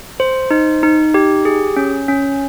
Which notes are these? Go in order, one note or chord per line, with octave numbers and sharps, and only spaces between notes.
C5
D#4
D#4
G4
G#4
C#4
C#4